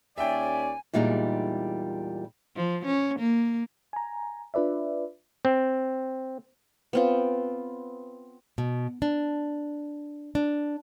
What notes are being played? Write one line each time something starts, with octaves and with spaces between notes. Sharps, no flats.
D#2 C#4 D5 E5 G5 G#5
E2 A#2 G3 G#3 D#4
F3
C#4
A#3
G#5 A#5
D4 F4 B4 D5 E5
C4
B3 C4 F4
B2
D4
D4